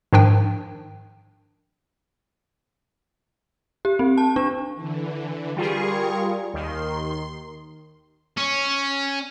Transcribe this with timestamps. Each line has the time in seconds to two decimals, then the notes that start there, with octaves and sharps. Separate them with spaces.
0.13 G#2 D#3 F3 D4 G5
3.85 G4
3.99 C4
4.18 A5
4.36 D4
4.75 D3 E3
5.56 G3 F4 G#4 A#4 C#6
6.54 D#2 D#3 C6
8.37 C#4